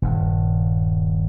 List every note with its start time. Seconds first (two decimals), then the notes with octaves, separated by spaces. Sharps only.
0.02 D#1 G2